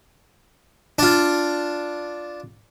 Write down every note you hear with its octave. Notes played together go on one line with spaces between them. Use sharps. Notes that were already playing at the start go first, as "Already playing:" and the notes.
D4 F4